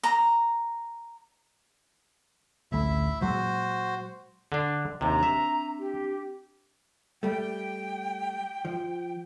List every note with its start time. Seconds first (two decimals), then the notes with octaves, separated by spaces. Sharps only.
0.03 A#5
2.72 A1 D2 A3 E4 E5
3.21 A#2 F#3 G#3 F#4 C5
4.52 D3 D4
5.01 D#2 C3 C4 D4 A#5
5.23 E5
5.79 G4
7.23 G3 A3 G5
8.65 F3